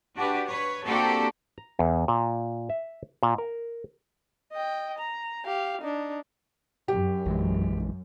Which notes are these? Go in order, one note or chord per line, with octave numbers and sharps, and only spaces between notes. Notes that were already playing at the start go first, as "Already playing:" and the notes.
D4 F#4 G4 B4
B4 C#5
A#3 C4 D4 F#4 G4 A4
A#5
E2
A#2
E5
A#2
A#4
D#5 G5
A#5
G4 F5
D4 D#4
F#2 G4
A#1 E3 G#3